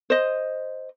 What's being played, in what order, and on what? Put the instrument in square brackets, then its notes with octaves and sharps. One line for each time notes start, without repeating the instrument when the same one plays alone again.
[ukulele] C5 D#5